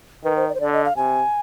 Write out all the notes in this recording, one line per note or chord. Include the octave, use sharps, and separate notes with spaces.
D#3 B4
C5
D5
C5
D3 D5
D#5
F5
C3 G#5